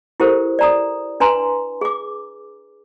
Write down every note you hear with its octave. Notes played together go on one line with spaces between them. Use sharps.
E4 G4 A4 A#4 C5
D5 A#5 D#6
D4 B4 G#5 A#5 C6
G#4 D6